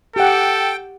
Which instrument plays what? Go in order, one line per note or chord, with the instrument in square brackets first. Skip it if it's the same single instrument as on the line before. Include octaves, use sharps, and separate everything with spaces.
[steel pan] G4 F#5 [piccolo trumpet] A4 [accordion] G5